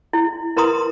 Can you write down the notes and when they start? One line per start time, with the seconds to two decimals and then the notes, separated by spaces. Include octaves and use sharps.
0.13 E4
0.57 E4 A#4 B4 A#5 C6 D#6